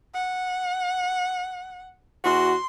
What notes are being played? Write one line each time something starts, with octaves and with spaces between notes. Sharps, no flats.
F#5
E2 F#4 C6